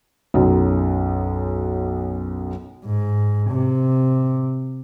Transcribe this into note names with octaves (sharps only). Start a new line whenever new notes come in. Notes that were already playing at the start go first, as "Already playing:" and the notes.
B1 F#2
G#2
C3